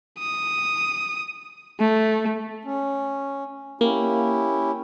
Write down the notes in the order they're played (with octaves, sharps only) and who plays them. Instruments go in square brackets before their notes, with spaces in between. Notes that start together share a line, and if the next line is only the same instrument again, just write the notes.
[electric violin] D#6
A3
[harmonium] C#4
[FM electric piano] A#3 [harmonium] C#4 E4 G4